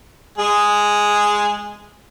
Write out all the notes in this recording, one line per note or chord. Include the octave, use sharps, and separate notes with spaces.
G#3 G#4